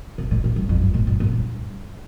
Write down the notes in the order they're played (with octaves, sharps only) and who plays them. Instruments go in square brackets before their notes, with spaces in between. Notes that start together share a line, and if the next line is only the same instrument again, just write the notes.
[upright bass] C3
A#2
A#2
G2
F2
G2
A#2
G2
A#2
G2